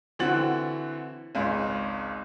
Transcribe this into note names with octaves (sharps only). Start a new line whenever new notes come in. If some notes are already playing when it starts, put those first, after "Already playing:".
D3 E3 C4 F#4 A6 F#7
G#1 C#2 G#2